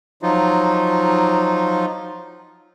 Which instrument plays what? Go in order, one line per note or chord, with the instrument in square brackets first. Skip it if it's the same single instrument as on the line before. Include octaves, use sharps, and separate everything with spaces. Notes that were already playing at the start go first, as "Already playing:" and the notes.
[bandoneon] F3 F#3 D#4 F4